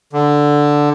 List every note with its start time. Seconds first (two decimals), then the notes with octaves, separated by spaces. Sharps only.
0.13 D3